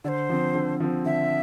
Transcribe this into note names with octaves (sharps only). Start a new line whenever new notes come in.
D3 C5 D5
F3 C4
D3
F3 C4
D3 E5